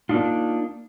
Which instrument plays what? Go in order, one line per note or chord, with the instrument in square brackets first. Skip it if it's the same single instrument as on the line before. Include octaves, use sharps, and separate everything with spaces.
[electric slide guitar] A#3 D4 D#4 F4